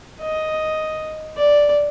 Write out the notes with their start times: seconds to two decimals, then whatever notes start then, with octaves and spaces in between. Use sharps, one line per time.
0.20 D#5
1.37 D5